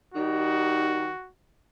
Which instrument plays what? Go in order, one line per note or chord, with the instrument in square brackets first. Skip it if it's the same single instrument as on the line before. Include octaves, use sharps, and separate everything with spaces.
[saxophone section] D#3 G3 D#4 [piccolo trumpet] F#4